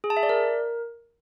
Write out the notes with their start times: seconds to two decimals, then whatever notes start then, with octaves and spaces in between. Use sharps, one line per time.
0.04 G#4
0.10 A5
0.17 E5
0.23 D5
0.29 A#4